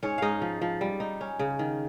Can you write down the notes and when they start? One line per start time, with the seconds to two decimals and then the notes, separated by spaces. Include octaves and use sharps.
0.03 G#2 C#4 C#5
0.18 G#2 D#4 D#5 F5
0.42 F3
0.61 F3
0.81 G3
1.00 D#4
1.21 C#4
1.39 C#3
1.59 D#3